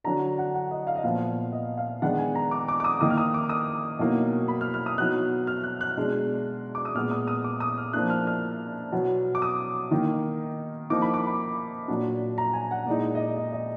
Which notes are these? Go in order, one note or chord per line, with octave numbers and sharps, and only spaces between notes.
D3 F#3 D4 A#5
F#5
F#5
D#5
F5
D#5
A#2 F3 B3 F5
D#5
F5
D#3 G#3 B3 D4 F#5
G#5
A#5
D6
D6
D6
D#6
D#3 A#3 D#4 D#6
F6
D#6
D6
D#6
B2 F#3 A#3 D#4
B5
F6
F6
D#6
B2 F#3 B3 D#4 F#6
F6
F#6
F#6
B2 G#3 D4
D6
D#6
A#2 G#3 B3 F6
D#6
D#6
D6
D#6
F6
F3 A#3 D4 F#6
F6
F6
B2 F#3 B3
D6
D#6
D#3 A#3 D#4
F3 A#3 D#4 D6
B5
D6
B5
A#2 F#3 D4
A#5
G#5
F#5
A#2 G#3 D#4 D5
D#5
D#5
D5
D#5
D#5